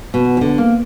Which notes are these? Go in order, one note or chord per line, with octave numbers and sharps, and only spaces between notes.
B2
E3
D3
A#3